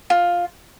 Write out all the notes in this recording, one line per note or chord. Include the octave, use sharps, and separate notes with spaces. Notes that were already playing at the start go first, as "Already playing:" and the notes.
F4